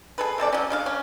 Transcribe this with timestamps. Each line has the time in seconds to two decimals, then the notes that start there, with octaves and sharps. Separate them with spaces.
0.18 G#4 A4 B4
0.38 C3 E3 A4 D5
0.52 F#3 C#4
0.70 C#3 D4 F5
0.86 C#4